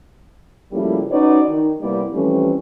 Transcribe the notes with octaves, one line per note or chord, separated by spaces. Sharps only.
C#3 F3 G3 A3 A#3 E4
C#4 D#4 F#4 B4 C#5 D5
D#3
C3 G3 A#3 B3 E4 D5
E3 F3 G3 A3 C4 C#4